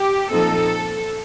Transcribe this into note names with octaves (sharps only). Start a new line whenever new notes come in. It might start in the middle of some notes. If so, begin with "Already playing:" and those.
Already playing: G4
A#2 F3 C4 D#4 A4